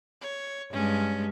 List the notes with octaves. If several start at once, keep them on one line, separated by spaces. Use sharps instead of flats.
C#5
G2 G#3 C#4